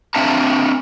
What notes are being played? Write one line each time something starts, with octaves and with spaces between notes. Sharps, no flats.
C4 D4 E5 F5 A5 A#5